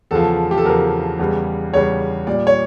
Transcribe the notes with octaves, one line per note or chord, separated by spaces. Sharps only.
E2 C#3 F3 A4
G4
A4
E2 C#3 F3 A#4
E2 C#3 G3
E2 C#3 G3 C#5
A#2 G3 D5
C#5